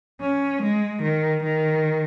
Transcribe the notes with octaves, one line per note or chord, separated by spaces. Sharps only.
C#4
G#3
D#3
D#3